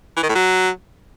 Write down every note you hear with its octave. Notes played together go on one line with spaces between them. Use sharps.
E3
D#3
A2
F#3